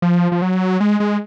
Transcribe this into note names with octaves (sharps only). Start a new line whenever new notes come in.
F3
F3
F#3
G#3
G#3